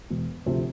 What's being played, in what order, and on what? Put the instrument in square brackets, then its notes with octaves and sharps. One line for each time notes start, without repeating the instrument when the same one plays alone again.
[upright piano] E1
D2 C3 F3 C4